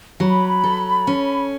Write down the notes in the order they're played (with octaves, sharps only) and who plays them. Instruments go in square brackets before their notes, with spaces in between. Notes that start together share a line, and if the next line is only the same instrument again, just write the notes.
[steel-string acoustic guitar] F#3 [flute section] B5
[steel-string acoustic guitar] A4
C#4